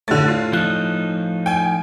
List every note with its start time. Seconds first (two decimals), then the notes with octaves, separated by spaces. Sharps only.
0.08 A2 D3 A6
0.28 F4
0.53 F3 D#4 F#6
1.46 G5 G#5